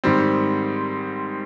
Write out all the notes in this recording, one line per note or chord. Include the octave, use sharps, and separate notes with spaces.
G#2 D#3 G3 C4